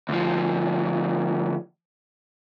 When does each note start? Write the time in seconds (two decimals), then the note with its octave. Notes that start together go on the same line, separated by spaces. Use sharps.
0.09 D2 F3